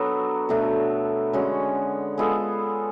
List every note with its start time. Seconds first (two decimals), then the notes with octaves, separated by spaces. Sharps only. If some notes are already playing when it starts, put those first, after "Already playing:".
Already playing: F#3 B3 D4 F#4 A4
0.49 B2 A3 D4 F#4
1.33 D3 G#3 C#4 F#4
2.18 G#3 B3 F4 A4